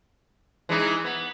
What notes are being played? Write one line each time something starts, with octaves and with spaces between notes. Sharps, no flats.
E3 G#3 D#4
B3